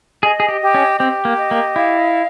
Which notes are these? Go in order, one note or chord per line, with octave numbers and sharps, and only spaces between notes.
G#4 D#5
G#4
G4
G4
C#4
C4 G4
A#3
D#5
A#3
E4 F5